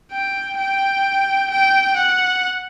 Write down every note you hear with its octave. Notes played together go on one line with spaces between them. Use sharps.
G5
G5
G5
F#5